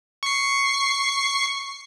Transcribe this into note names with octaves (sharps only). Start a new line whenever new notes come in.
C#6 C7